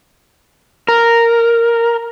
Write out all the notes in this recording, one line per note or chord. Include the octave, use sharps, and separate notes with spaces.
A#4